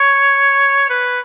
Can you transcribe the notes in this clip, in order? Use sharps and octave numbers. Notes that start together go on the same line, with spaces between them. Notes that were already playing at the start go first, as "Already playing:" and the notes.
Already playing: C#5
B4